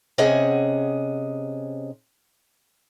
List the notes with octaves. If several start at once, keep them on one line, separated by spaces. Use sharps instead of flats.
C3 C#4 G#4 D#5 F#5